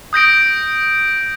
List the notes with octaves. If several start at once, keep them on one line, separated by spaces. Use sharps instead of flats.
D#6 G6 A#6 D7